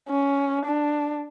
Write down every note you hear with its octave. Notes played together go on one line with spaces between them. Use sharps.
C#4
D4